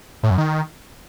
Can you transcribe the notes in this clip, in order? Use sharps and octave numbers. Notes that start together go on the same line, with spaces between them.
A2
F#2
D#3